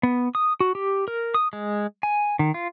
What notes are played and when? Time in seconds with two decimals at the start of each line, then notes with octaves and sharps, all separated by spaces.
0.03 B3
0.35 D#6
0.60 F#4
0.75 G4
1.08 A#4
1.34 D#6
1.53 G#3
2.03 G#5
2.39 D#3
2.54 F4